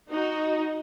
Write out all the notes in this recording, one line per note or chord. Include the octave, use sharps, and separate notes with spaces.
D#4 F#4